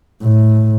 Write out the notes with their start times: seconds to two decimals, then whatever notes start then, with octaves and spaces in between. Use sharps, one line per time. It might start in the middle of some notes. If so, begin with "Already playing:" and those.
0.22 A2